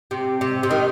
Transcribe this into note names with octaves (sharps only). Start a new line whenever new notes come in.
C3
C3
C3
D#3